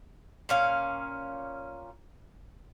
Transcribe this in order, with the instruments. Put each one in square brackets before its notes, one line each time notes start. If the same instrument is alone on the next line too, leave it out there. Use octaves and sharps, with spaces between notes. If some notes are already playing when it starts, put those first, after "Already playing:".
[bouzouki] A#2 C#4 F5